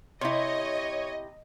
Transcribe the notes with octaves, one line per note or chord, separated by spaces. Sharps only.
C3 E4 C#5 D#5